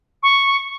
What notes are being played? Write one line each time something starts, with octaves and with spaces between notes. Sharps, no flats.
C#6